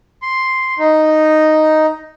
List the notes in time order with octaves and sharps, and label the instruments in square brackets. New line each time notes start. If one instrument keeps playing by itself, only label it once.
[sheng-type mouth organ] C6
D#4